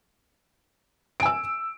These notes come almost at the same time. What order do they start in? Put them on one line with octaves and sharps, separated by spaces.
D7 G#5 E6